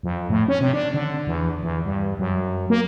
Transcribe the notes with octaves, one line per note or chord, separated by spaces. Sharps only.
F2
A2
C#4
C3
D4
D3
E2
E2
G2
F#2
A#3